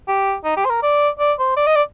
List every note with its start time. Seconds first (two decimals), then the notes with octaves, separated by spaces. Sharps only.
0.08 G4
0.44 D#4
0.57 G4
0.65 C5
0.70 A#4
0.82 D5
1.19 D5
1.39 C5
1.57 D5
1.66 D#5
1.76 D5